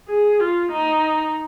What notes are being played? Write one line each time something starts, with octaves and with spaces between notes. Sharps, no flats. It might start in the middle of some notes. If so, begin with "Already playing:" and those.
G#4
F4
D#4